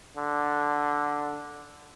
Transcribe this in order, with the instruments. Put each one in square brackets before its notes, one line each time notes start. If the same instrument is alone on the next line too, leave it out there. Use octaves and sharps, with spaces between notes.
[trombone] D3